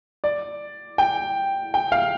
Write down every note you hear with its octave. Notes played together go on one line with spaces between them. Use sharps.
D5
G5
G5
F5